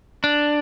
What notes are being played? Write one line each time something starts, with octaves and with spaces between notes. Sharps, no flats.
D4